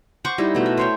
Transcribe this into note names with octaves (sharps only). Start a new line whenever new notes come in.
C5 F#5 C#6 D6
G3 D#4 E4
B2 A3
E5
C5 C#5 G5